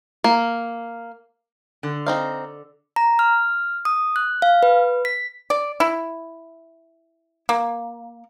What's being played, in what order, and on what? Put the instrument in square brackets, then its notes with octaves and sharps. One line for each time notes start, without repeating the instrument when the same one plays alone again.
[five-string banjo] A#3
[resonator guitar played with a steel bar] D3
[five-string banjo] C4 D#4 F5
[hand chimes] A#5
F6
D#6
F#6
F5
B4
B6
[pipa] D5
E4
A#3